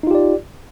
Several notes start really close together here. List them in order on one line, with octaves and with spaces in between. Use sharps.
D#4 F4 G4 D5